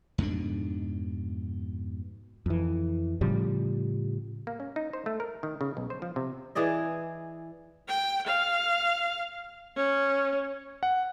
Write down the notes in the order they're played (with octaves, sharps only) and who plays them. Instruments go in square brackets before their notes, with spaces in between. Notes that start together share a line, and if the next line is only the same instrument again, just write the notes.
[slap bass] F2 G#2 B2 D4
[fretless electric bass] F2 E3
A2 C#3 F3 G3
[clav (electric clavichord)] A#3
C#4
D#4
C5
A3
A#4
D#3
C#3
B1
C5
F3
C3
[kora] E3 G#4 D5 D#5
[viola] G5
F5
C#4
[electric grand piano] F#5